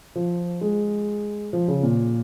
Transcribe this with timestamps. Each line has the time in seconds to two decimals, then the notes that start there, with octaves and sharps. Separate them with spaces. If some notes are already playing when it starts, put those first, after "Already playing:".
0.16 F3
0.61 G#3
1.53 F3
1.68 C#3
1.83 A#2